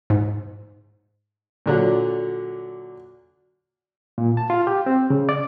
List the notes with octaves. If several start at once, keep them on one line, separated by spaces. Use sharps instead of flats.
G#2
A#2 D3 F#3
A#2
A5
F4
G4
C4
C#3
D5